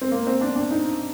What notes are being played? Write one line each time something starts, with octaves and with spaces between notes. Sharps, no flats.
C4
A#3
C4
D4
D4
D#4